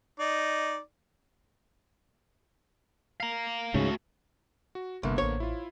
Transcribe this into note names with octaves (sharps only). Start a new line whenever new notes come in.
D#4 D5
F5 A#5
C#2 G#2 C#3 A3 F#4
F#4
G1 C2 D3 A#3 B3
A1 C5 C#5
E4 F4